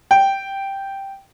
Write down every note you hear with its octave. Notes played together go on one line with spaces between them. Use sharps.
G5